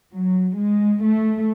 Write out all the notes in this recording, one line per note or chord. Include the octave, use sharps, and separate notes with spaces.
F#3
G#3
A3